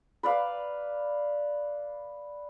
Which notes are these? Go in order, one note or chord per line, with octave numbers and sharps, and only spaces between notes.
B4 D5 F5